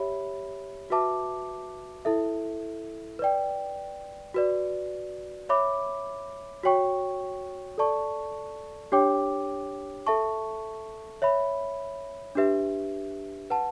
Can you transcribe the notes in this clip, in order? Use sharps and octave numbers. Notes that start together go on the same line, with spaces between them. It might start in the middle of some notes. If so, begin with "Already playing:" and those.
Already playing: G4 C#5 E5 B5
F#4 B4 E5 A5 D6
E4 A4 E5
B4 D5 G5
F#4 B4 D5
C#5 E5 B5 D6
F#4 C#5 G5 C#6
A4 D5 A5 C#6
D4 G4 C#5 G5 D6
A4 E5 A5 C#6
C#5 E5 B5
D4 G4 B4 E5
B4 F#5 A5